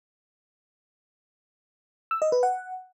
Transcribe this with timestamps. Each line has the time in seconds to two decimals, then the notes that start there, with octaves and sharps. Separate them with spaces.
2.11 E6
2.22 D#5
2.32 B4
2.43 F#5